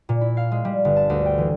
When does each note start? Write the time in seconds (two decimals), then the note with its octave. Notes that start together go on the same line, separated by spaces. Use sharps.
0.09 A#2
0.21 E4
0.37 F5
0.52 G#3
0.65 G3
0.85 G1
0.96 A5
1.10 D2
1.26 G5
1.38 E3